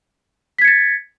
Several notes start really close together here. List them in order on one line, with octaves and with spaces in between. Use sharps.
B6 G#6 C#7 A6